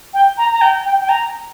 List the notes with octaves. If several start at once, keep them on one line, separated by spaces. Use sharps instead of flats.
G5
A#5
A#5
G5
G5
G5
A#5